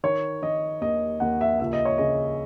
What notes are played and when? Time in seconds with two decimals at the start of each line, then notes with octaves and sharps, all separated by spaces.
0.03 D#3 C#5
0.42 D#3 D#5
0.81 D#2 D#5
1.20 D#2 F#5
1.41 E5
1.60 C#2 E5
1.73 D#5
1.85 C#5
1.98 C#3 D#5